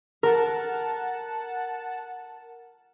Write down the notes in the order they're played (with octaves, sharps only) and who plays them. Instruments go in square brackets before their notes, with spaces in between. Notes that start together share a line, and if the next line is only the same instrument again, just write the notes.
[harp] A#4 [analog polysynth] F#5 A5